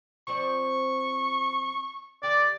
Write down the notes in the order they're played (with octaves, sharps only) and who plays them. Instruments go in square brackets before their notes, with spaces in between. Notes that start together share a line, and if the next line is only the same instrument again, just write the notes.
[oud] F3 C4 D5 [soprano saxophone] C#6
[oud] D3 G4 [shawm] D5